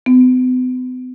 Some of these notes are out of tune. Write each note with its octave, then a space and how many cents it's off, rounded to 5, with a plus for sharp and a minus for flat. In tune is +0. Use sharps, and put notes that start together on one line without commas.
B3 +45